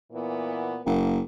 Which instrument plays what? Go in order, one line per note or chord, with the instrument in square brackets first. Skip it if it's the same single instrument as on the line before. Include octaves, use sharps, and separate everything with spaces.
[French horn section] A#2 E3 B3
[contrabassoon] F#1 [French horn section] A#3